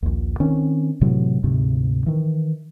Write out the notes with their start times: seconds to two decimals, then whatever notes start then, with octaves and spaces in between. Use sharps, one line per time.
0.03 A#1 D#2
0.40 D#3 C4 C#4
1.01 A2 C3 E3 F#3
1.44 D2 G#2 C3
2.06 D#3 E3